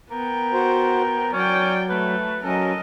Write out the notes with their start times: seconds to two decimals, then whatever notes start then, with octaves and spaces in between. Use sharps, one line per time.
0.11 B3 A#4 G5
0.53 F#4 C5
1.33 F#3 C#4 D5 G5
1.89 A3 B4
2.44 F#3 C#4 A4 A#4 D#5